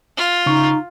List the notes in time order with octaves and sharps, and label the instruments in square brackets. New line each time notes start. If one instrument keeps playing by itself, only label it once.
[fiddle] F4
[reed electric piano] C#3 C#6 [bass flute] D#4